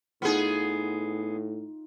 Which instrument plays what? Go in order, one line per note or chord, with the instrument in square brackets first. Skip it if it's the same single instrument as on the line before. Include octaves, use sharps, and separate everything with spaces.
[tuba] A2 [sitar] B3 G#4 [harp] D#4 F4